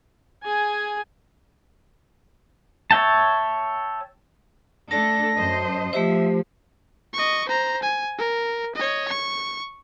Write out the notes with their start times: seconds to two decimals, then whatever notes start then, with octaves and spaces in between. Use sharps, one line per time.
0.43 G#4 G#5
2.91 C#5 E5 G5 A5
4.91 A3 D4 A4 A5 A#6
5.36 F#2 C5 D#5
5.93 F3 A3 G4 C5 E5
7.13 D#5 C#6
7.48 C5 A#5
7.83 G#5
8.18 A#4
8.75 C#5 D#5
9.08 C#6